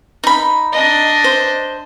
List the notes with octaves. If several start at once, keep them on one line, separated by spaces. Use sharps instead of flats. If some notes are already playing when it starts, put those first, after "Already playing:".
D#4 B5
D4 D#5
C5